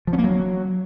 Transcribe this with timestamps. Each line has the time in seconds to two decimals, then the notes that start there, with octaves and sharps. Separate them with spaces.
0.07 F3
0.13 C#4
0.18 A#3
0.24 F#3